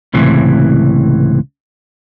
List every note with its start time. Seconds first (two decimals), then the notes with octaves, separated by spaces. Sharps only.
0.14 C#2 A2 C3 E3